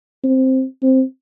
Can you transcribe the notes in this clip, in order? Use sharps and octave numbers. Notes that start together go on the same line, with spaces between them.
C4
C4